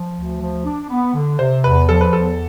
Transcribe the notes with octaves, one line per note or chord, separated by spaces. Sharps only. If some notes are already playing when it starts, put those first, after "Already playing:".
Already playing: F3
D2
F3
D4
B3
D3
C3 C5
E2 B4
F3 A4
B4
E2 A4